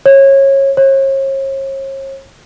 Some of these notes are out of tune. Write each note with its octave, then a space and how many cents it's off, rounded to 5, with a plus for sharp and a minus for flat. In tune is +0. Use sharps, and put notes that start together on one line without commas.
C#5 -25
C#5 -40